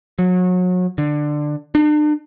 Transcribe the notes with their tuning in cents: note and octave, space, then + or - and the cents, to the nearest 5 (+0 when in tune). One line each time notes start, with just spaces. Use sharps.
F#3 -30
D3 +15
D4 +40